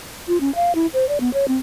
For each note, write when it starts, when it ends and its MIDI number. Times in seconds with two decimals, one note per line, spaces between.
0.28 0.40 65
0.41 0.54 61
0.55 0.74 77
0.75 0.87 64
0.94 1.08 72
1.09 1.18 74
1.20 1.32 59
1.34 1.48 73
1.48 1.57 60